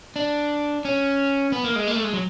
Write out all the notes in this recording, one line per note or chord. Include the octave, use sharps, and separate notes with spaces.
D4
C#4
B3
A#3
G#3
A#3
A3
G#3
F#3